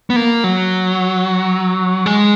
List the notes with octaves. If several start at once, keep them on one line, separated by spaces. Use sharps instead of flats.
B3
A#3
F#3
G#3